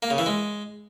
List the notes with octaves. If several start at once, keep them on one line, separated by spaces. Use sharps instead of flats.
A#3
C#3
E3
G#3